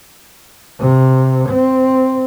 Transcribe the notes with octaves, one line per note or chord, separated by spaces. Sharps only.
C3
C4